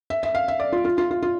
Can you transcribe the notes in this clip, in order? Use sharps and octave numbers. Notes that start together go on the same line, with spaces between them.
E5
E5
F5
E5
D5
F4
F4
F4
F4
F4